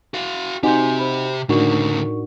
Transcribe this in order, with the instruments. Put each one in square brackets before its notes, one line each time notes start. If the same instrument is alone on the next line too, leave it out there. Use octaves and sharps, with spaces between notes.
[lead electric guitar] F#4 F5
[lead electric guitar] C3 G4 [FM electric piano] C4 D#4 F#4 [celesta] G#5 C6 G6
[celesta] C5 B5
[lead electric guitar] D2 C#3 [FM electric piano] A2 D4 F#4 [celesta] D#4 A#4 C#6